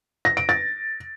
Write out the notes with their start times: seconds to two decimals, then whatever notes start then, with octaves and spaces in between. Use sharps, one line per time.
0.25 A#6
0.37 D7
0.49 A6